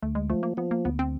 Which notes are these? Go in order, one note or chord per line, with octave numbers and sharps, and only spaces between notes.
D2 A3
G#3
F3 A3
A#3
F3 B3
A#3
D2 B3
C4